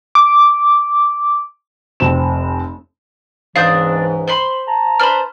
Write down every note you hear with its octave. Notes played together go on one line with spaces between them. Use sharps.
D6
F1 C4 E7
C#2 G#2 E3 C4 D4 F5 D#6 G6
C5 B5 C6
A5 A#5
D4 B4 C5 B5 F6